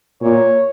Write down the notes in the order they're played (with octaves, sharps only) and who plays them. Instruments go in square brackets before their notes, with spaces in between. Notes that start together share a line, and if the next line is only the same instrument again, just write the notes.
[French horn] A#2 [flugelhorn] C#5